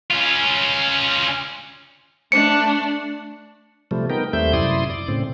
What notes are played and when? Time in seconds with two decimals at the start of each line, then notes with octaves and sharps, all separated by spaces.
0.11 C#4 F4
2.32 A3 D4 C#7
3.91 C3 F3 G3 A3
4.10 B3 D#4 A#4 G5
4.33 D#2 G3 A3 C4 E5 G6
4.53 F#2 C3 E4 D5 C6 D#6
4.90 D5
5.08 A2 C#3 C4